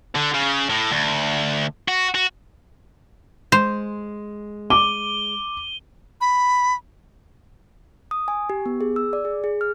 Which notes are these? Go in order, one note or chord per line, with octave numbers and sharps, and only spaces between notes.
D3
C#3
A2
D2
F#4
F#4
G#3 C5
D6 D#7 G7
B5
D#6
G#5
G4
B3
G#4
E6
D5
G#4
G#4
F6